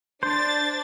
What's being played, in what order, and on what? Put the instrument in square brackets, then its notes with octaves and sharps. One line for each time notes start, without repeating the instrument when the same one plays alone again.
[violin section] D4 A6 [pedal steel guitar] C5